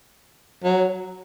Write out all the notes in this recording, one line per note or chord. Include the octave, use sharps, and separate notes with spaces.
F#3